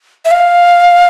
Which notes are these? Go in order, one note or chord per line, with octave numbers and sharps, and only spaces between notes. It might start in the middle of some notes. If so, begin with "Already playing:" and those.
E5
F5